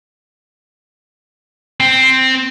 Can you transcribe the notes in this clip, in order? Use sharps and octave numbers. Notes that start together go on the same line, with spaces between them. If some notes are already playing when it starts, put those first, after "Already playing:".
C4